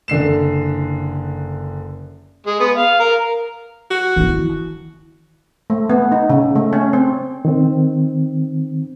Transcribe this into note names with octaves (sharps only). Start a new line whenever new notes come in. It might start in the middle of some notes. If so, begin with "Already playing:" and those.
F#1 D3 C7 E7
G#3
B3
F5
A#4
F#4
D#3 E3
A3
B3
D#4
C#3
A3
C#4
C4
D#3 C4